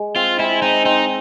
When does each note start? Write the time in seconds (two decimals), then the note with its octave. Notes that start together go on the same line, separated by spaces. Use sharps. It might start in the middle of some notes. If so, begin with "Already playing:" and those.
Already playing: G#3
0.16 C4 F4
0.39 G#3 E4
0.62 C4 D#4
0.85 C4 D#4